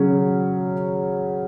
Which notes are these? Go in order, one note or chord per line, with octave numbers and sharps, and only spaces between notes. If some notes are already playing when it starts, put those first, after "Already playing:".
Already playing: C#3 F#3 C#4